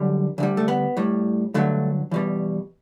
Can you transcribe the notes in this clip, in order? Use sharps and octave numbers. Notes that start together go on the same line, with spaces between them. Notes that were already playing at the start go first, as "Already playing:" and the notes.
Already playing: F#2 D3 G3
D2 D3 G3
A3
B3
A2 G3
G2 D3 F#3 A3
E2 B2 G3